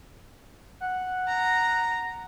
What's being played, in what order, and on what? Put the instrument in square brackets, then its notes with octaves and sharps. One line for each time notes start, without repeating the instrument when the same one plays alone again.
[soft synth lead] F#5
[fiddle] A#5